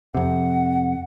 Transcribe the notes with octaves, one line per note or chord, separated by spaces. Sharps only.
F2 C3 F#5